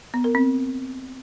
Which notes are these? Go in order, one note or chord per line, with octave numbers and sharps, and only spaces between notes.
B3
A#4
C4